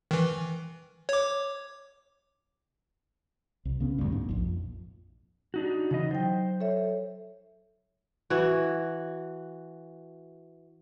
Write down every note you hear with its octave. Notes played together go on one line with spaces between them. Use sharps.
D#3 E3
C#5 D6
C2
C#3 B3 C#4
D2 G2
G#2
A#1 F2
D4 D#4 F#4
C#3 E3 D#4 D#5
F#3 C5 G5
A4 C#5 E5
E3 F#4